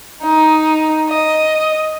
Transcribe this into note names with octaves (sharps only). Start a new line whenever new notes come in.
D#4
D#5